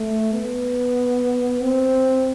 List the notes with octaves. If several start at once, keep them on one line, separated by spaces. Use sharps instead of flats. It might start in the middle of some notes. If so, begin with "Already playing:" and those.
Already playing: A3
B3
C4